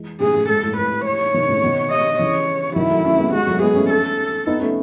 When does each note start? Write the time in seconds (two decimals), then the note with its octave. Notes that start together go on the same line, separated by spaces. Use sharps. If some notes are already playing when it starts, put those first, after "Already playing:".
Already playing: E3 G#3
0.20 A2 C#3 G#4
0.35 A2
0.49 G#2 A4
0.63 A2
0.77 A2 B4
1.07 C#5
1.34 B2 D#3
1.48 A2 C#3
1.63 B2 D#3
1.91 D#5
2.19 C#3 E3 C#5
2.76 D#3 F#3 E4
2.90 F#3 A3
3.04 A3 C#4
3.18 G#3 B3
3.33 G#3 B3 F#4
3.47 F#3 A3
3.62 G#3 B3 G#4
3.75 A3 C#4
3.90 A4
4.47 B3 D#4
4.60 A3 C#4